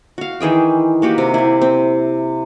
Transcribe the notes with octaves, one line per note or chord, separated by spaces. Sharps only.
F#4 F5
D#3 E3 G#4 G5
A#3 F#4 G4 B4
C3
E4 G4
C4